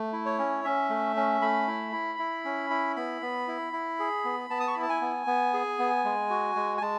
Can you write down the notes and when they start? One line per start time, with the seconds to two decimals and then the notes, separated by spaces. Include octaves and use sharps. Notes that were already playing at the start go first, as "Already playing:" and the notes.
Already playing: A3
0.13 E4
0.26 C#5
0.39 C#4
0.64 C#4 E5
0.90 A3
1.16 C#4
1.41 A3 B5
1.68 E4
1.93 E4
2.19 E4
2.45 C#4
2.70 E4
2.96 B3 B5
3.22 B3
3.48 E4
3.73 E4
3.99 G#4
4.25 B3
4.50 B3 A5
4.60 D#6
4.68 C#6
4.74 E4 B5
4.82 A5
4.89 G#5
5.01 B3
5.27 B3
5.54 G#4
5.79 B3
6.04 G#3
6.30 F#4
6.55 G#3
6.78 G#5
6.82 G#3 A5